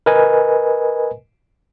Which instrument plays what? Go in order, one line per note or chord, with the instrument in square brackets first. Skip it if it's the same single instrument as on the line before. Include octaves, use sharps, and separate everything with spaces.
[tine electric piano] A#4 B4 D#5 G#5